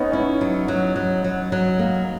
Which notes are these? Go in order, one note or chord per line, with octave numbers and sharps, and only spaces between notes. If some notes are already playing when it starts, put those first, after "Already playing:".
Already playing: B3 C#4 D#4
C#4 E4
F#3
F#3
F#3
F#3
F#3
A#3